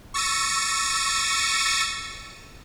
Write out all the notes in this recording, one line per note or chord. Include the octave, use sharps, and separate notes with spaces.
C#6 E6 A6 A#6 C#7 D#7